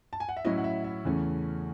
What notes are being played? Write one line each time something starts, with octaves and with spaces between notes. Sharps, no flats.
A5
G#5
F#5
E5
A2 F#3 C#4 E4 D#5
F#5
E5
E5
E2 C#3 E3 A3 C#4